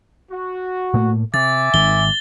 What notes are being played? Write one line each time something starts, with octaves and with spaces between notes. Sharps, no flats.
F#4
A2 A3 A#3
C3 E5 G#5 D6 A6
G#1 D#3 G7